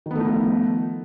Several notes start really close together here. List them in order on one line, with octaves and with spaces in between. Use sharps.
D#3 B3 A3 D#4 F3